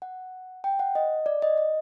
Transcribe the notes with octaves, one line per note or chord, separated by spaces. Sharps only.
F#5
G5
F#5
D#5
D5
D#5
D#5